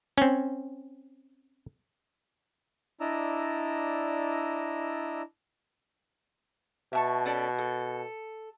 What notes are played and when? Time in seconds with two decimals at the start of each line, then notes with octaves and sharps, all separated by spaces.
0.18 C4 C#4
3.00 D4 E4 D5 D#5 A#5 E6
6.93 B2 E5 A5 C#6
7.25 C#4 A4 D5
7.59 A4